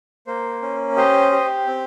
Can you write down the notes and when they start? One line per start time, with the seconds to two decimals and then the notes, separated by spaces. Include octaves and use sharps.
0.27 A#3 C5
0.62 C#4
0.96 G4 C5 D#5
1.32 G4
1.67 C4